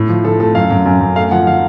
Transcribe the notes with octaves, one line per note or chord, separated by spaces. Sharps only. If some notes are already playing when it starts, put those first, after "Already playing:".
Already playing: A2
F3
F3 A4
A3 A4
F#2 F5
F#2
F#2
F#2
A3 F5
F3 F#5
F3 F5